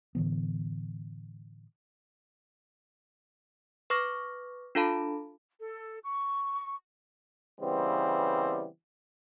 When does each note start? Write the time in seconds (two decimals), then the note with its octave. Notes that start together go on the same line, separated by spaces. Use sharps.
0.15 A2 D3 E3 B3
3.90 B4 C#6 D6 F6 A#6
4.75 D4 F4 A4 F5 A5 B5
5.60 A4
6.04 C#6
7.61 C#3 E3 G3 B3 C4